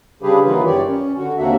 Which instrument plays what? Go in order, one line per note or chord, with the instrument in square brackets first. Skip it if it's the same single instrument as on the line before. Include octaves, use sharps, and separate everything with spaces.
[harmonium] C#3 G3 D4 G4 G#4 B4
D#3 E3 F#3 A#3 F4 B4
F#2 G4 C#5 D5
C#4
D3 F#4
D#2 C3 A#3 D4 F#4 E5